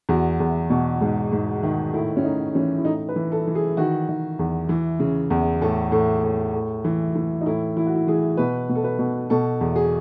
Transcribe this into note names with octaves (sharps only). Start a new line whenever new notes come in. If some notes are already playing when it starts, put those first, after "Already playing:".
E2 F#4
E2
B2
G#2
G#2
D#3
A2 E4
C#4
A2 D#4
E3 C#4
E4
A2 D#4
B4
E3
A4
E3
G#4
D#3 F#4
D#3
E2
E3
C#3
E2
A2 A4
A2
A2
A2
E3
E3
D#4
A2 E4
E3 E4
F#4
E4
E3 G#4
B2 B4
B2
A4
B4
B2
B2 A4
E2
G#4